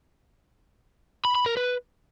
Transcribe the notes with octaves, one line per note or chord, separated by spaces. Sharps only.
B5
B5
A#4
B4